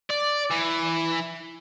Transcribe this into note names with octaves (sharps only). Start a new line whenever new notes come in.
D5
E3